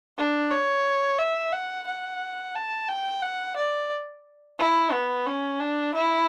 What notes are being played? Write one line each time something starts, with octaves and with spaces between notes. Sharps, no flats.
D4
C#5
E5
F#5
F#5
A5
G5
F#5
D5
E4
B3
C#4
D4
E4